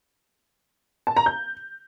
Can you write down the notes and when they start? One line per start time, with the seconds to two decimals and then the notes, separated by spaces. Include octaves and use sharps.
1.07 A5
1.17 A#5
1.26 G6